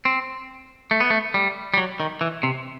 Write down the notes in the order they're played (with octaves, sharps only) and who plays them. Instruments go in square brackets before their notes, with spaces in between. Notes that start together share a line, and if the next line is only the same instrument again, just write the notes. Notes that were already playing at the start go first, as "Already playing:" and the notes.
[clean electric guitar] C4
A3
B3
A3
G3
G3
F#3
D#3
E3
C3